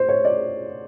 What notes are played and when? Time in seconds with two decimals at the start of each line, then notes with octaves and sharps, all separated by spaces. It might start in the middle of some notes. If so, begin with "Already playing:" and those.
Already playing: C5
0.09 C#5
0.25 D5